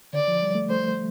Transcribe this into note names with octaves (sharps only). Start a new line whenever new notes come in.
D3 D5
F3
G3
A3
A3 C5